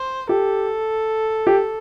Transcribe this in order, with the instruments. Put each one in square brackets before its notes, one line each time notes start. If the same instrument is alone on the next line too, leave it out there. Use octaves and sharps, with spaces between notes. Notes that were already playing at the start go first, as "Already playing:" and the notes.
Already playing: [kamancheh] C5
[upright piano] G4 [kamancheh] A4
[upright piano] G4